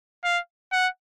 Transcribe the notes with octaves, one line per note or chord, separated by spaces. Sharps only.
F5
F#5